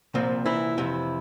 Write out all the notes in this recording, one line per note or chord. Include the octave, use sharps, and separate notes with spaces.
C2 A#2 F3 C4
E3 E4
F2 C3 E3